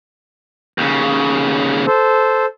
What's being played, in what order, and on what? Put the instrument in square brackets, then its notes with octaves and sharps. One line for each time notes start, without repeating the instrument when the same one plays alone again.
[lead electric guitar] D#2 C#3
[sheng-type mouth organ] A4 C5